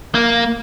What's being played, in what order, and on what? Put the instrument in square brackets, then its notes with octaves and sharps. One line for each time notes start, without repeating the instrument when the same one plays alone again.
[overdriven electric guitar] A#3